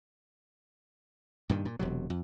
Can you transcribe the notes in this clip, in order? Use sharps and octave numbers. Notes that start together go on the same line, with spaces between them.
G2 A#2 D#3
A#2
E1 C3 F#3
F2